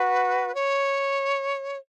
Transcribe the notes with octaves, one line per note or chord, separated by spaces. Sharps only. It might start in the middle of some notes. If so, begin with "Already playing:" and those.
Already playing: F#4 B4
C#5